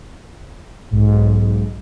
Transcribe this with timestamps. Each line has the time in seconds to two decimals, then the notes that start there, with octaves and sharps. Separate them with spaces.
0.91 B1 G#2